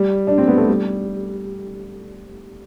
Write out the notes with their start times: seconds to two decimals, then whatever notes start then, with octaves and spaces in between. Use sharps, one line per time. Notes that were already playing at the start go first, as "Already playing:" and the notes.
Already playing: G3
0.27 D4
0.38 C4
0.48 B3
0.58 A3
0.69 G3